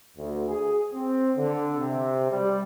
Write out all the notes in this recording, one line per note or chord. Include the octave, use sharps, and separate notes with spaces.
D2
G#4
C4
D3
C3
G3